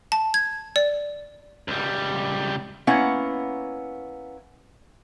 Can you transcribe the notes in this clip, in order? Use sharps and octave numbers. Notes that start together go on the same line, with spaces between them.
A5
G#6
D5
C#2 G3
A#3 B3 C#4 E4 F#5